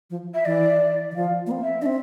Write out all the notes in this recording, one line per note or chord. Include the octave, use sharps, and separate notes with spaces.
F3
E5
E3 D5
E3
F3 F5
A#3
C4
E5
D4 D5
C4 E5